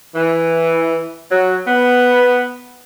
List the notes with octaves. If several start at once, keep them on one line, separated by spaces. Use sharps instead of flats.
E3
F#3
B3